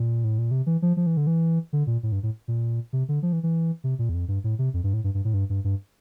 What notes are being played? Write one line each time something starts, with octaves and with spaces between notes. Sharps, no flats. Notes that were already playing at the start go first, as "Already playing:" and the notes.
Already playing: A#2
A2
A#2
C3
E3
F3
F3
E3
D3
E3
D3
A#2
A2
G2
A2
A#2
C3
D3
F3
E3
E3
C3
A#2
E2
F2
G2
A2
C3
F2
G2
A2
G2
G2
A2
G2
G2
G2